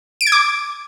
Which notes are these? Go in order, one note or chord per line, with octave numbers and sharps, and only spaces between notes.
D7
G#6
D6